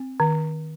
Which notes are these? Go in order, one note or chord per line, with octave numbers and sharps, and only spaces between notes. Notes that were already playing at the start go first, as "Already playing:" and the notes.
Already playing: C4
D#3